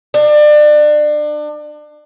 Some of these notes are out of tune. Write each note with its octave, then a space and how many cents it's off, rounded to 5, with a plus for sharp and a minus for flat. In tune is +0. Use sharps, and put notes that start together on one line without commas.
D4 +30